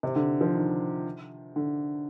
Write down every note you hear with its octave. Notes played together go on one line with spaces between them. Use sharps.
C3
D3
F3
D#3
D3